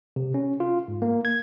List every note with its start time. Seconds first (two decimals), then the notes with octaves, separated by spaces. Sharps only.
0.16 C3
0.34 C#4
0.60 F4
0.88 G#2
1.02 A#3
1.25 G#6